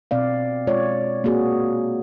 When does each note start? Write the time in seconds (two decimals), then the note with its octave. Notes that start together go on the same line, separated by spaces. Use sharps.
0.11 B2 C4 D5 F5
0.67 G#3 F4 C#5 D5
1.24 A#3 C4 F#4 G#4